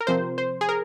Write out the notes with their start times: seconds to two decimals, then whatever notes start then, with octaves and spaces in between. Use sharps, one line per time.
0.01 A#4
0.07 C3 F3 C4 C5
0.38 C5
0.61 G#4
0.69 A#4